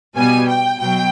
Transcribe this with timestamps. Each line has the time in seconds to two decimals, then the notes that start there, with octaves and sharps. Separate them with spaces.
0.16 B2 G3 B3 G#5
0.49 G5
0.80 B2 F#3 G5